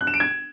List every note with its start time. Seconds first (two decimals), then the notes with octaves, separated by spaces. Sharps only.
0.01 F#6
0.07 E7
0.14 D7
0.20 G#6